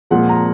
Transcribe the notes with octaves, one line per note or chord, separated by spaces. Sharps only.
A#2 F3 G#3 F#5
A#5